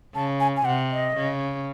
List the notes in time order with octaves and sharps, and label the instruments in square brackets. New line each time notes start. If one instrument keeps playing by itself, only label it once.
[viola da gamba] C#3 [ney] A5
[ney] G#5
G#5
[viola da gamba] C3 [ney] F#5
[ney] D#5
[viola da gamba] C#3